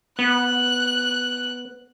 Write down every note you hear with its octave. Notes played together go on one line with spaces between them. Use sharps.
B3 F#6